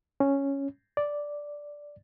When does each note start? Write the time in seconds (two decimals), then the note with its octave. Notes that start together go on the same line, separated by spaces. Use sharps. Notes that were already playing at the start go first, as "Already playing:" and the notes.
0.20 C#4
0.97 D5